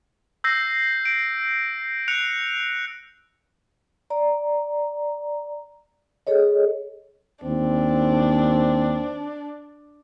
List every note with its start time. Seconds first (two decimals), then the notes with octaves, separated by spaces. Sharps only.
0.44 E6 G6 A#6 C7
1.05 D7
2.08 F#6 C#7 F7
4.10 D5 A#5
6.27 G#4 A4 C#5 D#5
7.44 D#2 C4 D4